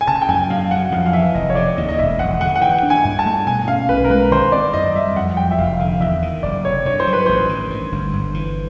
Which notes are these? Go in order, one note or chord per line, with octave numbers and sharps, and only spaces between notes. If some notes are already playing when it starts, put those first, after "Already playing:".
G#5
C#3 A5
G5
F#2 G#5
F#2 F5
F#3 F#5
F2 F5
F5
E3 E5
F1 D#5
C#5
C#3 D5
D#2 D#5
D#5
E1 E5
E1 F#5
D3 F#5
F#5
E3 G5
D4
G#5
G2
A5
A3
B2 G#5
C#4 F5
B1 B4
A#4
G#3 B4
D#3 C5
C4 D5
F#2 D#5
G3 E5
F2 F#5
F#3 G5
E5
F1 F5
D3 F5
E2 E5
D#3
F#1 D5
C3 C#5
G2 C#5
C5
F#3
B4
A1 C5
D#3
G2
G1
G1
E3